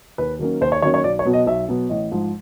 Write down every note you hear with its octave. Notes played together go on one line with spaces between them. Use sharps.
D#2 B4
D#3 F#3 A#3 C#4
D#2 C5
C#5
D#3 F#3 A#3 C#4 C#5
C#5
B1 D5
C#5
B2 F#3 B3
D#5
B1 E5
B2 F#3 B3
A1 D#5
G#2 F3